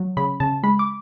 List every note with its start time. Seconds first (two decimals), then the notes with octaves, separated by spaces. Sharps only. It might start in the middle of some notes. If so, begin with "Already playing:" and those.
Already playing: F#3
0.17 C#3 B5
0.40 C#3 A5
0.63 G#3 B5
0.79 D6